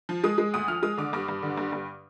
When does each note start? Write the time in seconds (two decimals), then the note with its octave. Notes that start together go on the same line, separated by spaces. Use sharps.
0.09 F3
0.24 G#3 D#6
0.38 G#3
0.53 D2 D#6
0.68 F3 F6
0.83 G#3 D#6
0.97 D3 D6
1.13 G2 D6
1.28 G2
1.42 D3
1.57 G2
1.72 G2